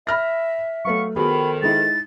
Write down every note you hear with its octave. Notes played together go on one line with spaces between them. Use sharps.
E5 B5 F6 A#6
F#3 A3 B3 F5 C#6
F2 D#3 B3 F#4 G#4 B5
G#3 D#4 E4 A6